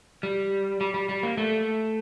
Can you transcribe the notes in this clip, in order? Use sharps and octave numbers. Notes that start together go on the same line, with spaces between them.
G3
G3
G3
G3
A#3
A3